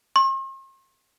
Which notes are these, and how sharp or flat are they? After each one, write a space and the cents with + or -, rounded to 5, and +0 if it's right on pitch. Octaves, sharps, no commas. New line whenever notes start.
C6 +45